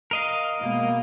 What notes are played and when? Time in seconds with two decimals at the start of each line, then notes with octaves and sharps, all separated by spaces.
0.11 A#4 D#5 F5
0.60 B2 G#3 A#3